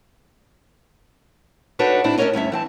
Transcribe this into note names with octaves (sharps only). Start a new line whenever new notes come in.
D4 D#4 F#4 A4 B4 C#5
A2 C4 D4 E4
C#4 D4 F4 A#4 C#5 D#5
D2 G2 C#4 E5
E3 C4 A5